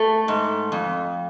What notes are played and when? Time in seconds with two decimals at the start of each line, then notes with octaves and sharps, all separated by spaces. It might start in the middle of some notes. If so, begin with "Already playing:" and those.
Already playing: A3
0.28 G#2
0.72 F2